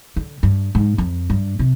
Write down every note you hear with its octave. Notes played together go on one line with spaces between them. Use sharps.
D3
G2
G#2
F2
G2
C3